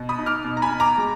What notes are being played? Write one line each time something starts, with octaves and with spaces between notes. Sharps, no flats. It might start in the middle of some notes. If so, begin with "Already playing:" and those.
Already playing: B2
B5 D#6
D#4
D6 F6
B2
A#5
G#5 B5
B2
A#5 D6
G#3